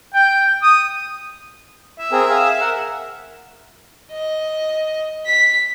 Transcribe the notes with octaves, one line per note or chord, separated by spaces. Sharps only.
G5
D#6
E5
C4 G#4 A#4
G#4 F5
A#4 F#5
D#5
B6